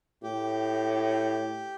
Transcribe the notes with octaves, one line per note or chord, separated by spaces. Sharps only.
A2 G4